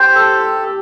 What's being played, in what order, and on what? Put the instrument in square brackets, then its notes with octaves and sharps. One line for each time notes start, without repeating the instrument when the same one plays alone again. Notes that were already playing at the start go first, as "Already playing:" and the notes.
Already playing: [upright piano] G4 [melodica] C5
[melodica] A4